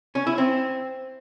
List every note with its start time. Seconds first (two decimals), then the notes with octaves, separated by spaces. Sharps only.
0.15 C#4
0.27 E4
0.38 C4